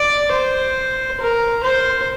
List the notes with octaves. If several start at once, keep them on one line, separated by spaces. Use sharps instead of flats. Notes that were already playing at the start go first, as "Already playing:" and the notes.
Already playing: D5
C5
A#4
C5